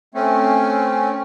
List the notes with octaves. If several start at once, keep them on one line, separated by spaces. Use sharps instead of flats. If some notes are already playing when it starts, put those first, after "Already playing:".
A3 C4 C#4